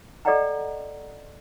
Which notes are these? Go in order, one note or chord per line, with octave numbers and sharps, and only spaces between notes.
A4 D5 D#5 F#5 G5 A#5